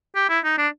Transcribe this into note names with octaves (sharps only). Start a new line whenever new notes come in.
G4
E4
D#4
D4